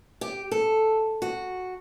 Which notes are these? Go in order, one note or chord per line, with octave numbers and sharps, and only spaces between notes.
G4
A4
F#4